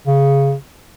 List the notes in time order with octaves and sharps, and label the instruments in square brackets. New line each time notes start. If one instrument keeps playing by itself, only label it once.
[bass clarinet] C#3